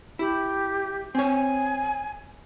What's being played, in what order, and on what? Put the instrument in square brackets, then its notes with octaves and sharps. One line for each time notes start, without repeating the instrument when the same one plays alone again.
[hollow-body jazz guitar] E4 [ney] G4
[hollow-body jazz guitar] C4 C#5 [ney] G#5